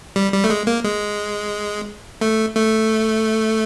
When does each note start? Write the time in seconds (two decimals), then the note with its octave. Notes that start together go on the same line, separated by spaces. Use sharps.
0.16 G3
0.33 G3
0.44 A3
0.50 G#3
0.67 A#3
0.84 G#3
2.21 A3
2.56 A3